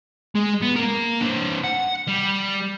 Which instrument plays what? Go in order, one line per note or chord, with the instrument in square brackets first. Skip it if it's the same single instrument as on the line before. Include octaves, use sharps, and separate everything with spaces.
[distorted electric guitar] G#3
B3
A#3 A#4
C4 D4
F#5
G3